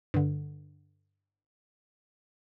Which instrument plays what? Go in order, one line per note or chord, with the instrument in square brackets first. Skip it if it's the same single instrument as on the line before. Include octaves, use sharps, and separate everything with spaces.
[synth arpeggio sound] G2 D3